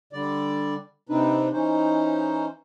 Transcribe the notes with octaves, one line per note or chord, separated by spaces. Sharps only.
D3 G3 D5
C3 C4 D4 D#4 B4
E3 C#4 D#4 C5